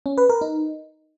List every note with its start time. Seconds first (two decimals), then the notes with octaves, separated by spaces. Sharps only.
0.06 C#4
0.18 B4
0.29 A#4
0.41 D#4